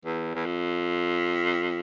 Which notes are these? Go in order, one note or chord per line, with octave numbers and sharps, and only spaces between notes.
E2
E2
F2